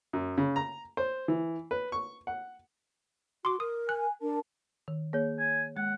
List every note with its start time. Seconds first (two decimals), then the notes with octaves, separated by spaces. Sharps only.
0.13 F#2
0.38 C#3
0.56 A#5
0.97 C5
1.28 E3
1.71 B4
1.92 C#6
2.27 F#5
3.45 F#4 C6 D6
3.60 A#4 D#6
3.89 G#5 F#6
4.22 D4 A#4 A5
4.88 D#3
5.13 A#3 G#4 C#5
5.39 G#5
5.77 G#3 F#5